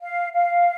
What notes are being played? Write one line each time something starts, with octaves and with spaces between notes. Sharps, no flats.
F5
F5